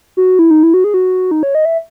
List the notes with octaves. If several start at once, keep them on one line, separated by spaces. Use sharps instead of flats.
F#4
E4
D#4
E4
F#4
G#4
F#4
D#4
C#5
D#5
E5